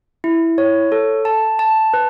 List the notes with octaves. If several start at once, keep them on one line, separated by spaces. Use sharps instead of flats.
E4
C#5
A4
A5
A5
B4